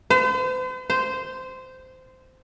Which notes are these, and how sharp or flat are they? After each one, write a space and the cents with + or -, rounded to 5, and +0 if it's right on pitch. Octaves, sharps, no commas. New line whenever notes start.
C5 -45
C5 -15